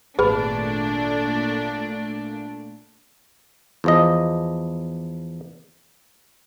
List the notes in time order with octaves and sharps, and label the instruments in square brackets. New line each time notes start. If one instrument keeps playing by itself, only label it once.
[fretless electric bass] G#1 [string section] A#2 A3 D4 [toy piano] G#4 B4 B5
[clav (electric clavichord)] E2 F3 D#5